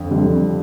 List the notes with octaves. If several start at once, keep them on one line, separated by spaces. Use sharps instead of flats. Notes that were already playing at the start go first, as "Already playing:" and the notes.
Already playing: F2 D3
F2 D3 G3